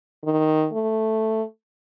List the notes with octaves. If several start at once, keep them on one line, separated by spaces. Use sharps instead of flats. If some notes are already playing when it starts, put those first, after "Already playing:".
D#3
A3